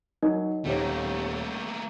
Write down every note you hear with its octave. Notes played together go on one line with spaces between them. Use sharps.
F#3 D#4 A#4 D#5
D#1 A3 A#3 G4 C#5